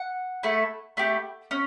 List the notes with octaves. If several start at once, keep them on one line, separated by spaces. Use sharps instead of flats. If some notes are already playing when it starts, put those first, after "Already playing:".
Already playing: F#5
A3 E4 A4
A3 E4 G4
C#4